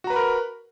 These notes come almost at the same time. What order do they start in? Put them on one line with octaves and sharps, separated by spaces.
F#4 A#5 B4 B5 A#4